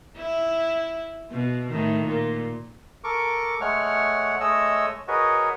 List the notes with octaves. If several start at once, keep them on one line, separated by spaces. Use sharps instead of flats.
E4
B2
A2 D#3
A#2
A4 A#4 C#6 D6
G#3 A3 C#5 F#5 F6
G#3 A3 C#5 D#5 E6
F#4 G#4 A#4 B4 C#5 D#5